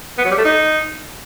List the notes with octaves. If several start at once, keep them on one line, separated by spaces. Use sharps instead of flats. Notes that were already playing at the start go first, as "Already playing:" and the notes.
B3
F#3
G3
A3
D#4